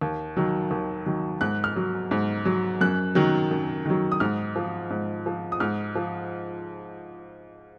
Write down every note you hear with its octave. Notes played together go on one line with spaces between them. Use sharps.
D#2
D#3 F#3
D#2
D#3 F#3
G#2 F#6
F6
F#3
G#2
F#3
F#2 F#6
D#3 F#3
F#2
D#3 F#3
D#6
G#2 F6
F3
G#2
F3
D#6
G#2 F6
F3